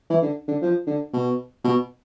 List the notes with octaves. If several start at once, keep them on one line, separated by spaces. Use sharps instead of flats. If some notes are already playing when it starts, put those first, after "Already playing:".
E3
D3
D3
F3
D3
B2
B2